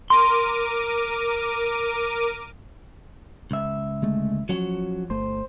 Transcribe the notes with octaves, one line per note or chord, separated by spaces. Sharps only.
A#4 C6 D6 D#7
C#2 E5
D3 G#3 A3
F3 F#3 C#4 F#4
G1 A3 C5